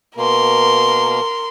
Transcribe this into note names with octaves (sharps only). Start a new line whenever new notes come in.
B2 A#3 A#4 C6